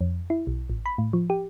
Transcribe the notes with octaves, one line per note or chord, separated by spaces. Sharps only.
F2
E4
B1
A1
B5
A2
F3
G4